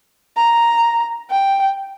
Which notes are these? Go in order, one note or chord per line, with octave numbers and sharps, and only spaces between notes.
A#5
G5